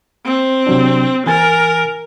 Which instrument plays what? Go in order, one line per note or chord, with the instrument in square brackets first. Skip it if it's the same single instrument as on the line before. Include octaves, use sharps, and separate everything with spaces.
[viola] C4
[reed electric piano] C3 F#3 D4
[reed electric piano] E3 G#5 A6 [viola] A#4